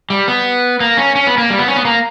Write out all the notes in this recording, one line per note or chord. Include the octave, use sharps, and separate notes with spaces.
G3
B3
A#3
C#4
C#4
B3
A#3
G3
B3
C#4
B3
A#3